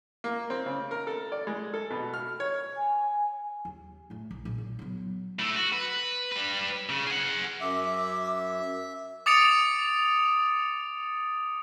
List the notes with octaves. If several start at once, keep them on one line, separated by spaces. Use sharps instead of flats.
A#3
C4
C#3
A#4
A4
D5
G#3
A4
B2
F6
C#5
G#5
D#2
A2 A3
A#1
A#2
B1
F#3 B3
A3 E4
F#4
B4
G3 B4
C#3
G#4 F#5
F#2 E5 D6
D6 D#6 A6 C#7 D7 F7